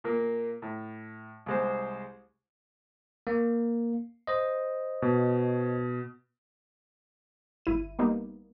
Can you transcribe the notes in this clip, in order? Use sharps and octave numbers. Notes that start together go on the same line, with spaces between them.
A#2 A#3
A2
C2 G#3 C5
A#3
C5 D#5
B2
G1 E4 D#7
G3 A#3 B3 D#4